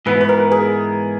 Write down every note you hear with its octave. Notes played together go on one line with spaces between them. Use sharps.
G#2 E3 B3 B4
B4
A#4
G#4